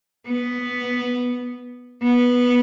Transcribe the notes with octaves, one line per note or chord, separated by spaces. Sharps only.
B3
B3